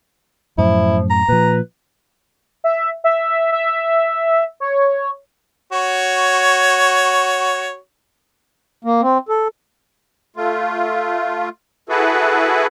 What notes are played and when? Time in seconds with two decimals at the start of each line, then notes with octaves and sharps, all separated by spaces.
0.58 F#2 A2 F3 E4
1.10 A#5
1.28 A#2 F3 B4
2.64 E5
3.04 E5
3.52 E5
4.60 C#5
5.72 F#4 C#5
8.84 A#3
9.01 C4
9.29 A4
10.36 A3 F4
11.89 E4 F#4 G#4 A4 B4